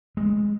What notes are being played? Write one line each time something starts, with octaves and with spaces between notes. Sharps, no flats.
G#3